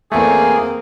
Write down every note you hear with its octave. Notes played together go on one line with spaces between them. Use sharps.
E2 A3 A#3 C4 G#4